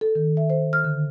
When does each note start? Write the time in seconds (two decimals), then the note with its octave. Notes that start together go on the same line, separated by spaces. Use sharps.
0.01 A4
0.15 D#3
0.37 E5
0.50 C5
0.73 F6
0.84 D3